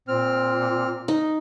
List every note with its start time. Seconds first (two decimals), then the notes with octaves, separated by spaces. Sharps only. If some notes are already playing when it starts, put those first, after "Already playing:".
0.08 A#2 C4 F6
1.08 D#4